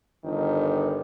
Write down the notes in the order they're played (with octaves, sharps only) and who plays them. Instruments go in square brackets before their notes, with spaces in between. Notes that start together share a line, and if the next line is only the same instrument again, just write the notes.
[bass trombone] G1 [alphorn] D#3